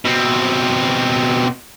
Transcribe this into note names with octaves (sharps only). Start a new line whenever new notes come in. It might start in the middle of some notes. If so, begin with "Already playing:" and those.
B2 C4